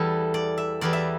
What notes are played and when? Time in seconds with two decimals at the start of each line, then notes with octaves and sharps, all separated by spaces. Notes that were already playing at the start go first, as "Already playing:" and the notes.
Already playing: E2 E3 G3 A4 D5
0.34 D5
0.58 E5
0.81 E2 E3 G3 D5
0.93 E5